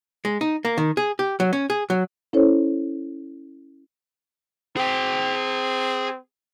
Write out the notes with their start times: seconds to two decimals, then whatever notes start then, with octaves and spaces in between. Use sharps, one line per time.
0.25 G#3
0.41 D#4
0.65 A#3
0.78 D#3
0.97 G#4
1.19 G4
1.40 F#3
1.53 C#4
1.70 G#4
1.90 F#3
2.33 C#4 E4 A4 C5 C#5
4.77 C4 G#4 G5